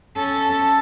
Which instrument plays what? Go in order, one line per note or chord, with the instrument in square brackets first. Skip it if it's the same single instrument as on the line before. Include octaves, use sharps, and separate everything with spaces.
[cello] C#4 A4